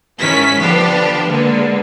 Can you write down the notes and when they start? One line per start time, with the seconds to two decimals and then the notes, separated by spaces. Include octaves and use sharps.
0.20 G#2 D#3 C#4 E4 B6
0.59 D3 F3 B3 D4 G4
1.28 D3 G#3 A#3 B3